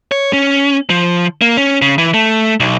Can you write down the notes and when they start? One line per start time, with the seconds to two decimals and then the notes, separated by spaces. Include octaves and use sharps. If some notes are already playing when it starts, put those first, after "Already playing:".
0.12 C#5
0.33 C#4
0.90 F3
1.41 A#3
1.57 C#4
1.82 C#3
1.98 E3
2.14 A3
2.60 B1